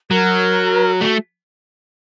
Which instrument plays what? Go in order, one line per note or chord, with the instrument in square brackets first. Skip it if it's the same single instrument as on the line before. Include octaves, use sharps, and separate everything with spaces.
[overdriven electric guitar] F#3 [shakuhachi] A#4
[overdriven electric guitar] A3 [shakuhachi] F#4